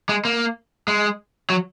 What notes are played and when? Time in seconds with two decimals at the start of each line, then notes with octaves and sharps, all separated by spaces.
0.09 G#3
0.25 A#3
0.88 G#3
1.50 F#3